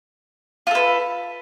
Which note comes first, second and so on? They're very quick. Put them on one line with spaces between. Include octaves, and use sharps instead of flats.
F4 A4 B4